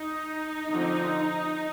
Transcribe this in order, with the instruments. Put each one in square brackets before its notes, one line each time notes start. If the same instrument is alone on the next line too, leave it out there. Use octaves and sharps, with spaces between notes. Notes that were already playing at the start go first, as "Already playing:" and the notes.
Already playing: [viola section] D#4
D3 F3 C4